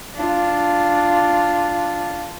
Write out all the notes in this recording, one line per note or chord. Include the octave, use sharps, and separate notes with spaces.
D4 F4